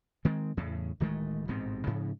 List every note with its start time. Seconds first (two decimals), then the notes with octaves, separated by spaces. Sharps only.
0.25 D#3 G#3 C4
0.57 E2 A2 C#3
1.00 D1 D#3 G#3 A3
1.48 A1 G#2 B2 C4
1.87 G#2 C#3 F3